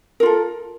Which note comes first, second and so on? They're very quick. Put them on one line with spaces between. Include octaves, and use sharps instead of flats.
A#4 F4 A4